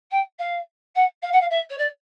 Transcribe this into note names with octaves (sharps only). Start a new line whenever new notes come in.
G5
F5
F#5
F5
F#5
F5
E5
C#5
D5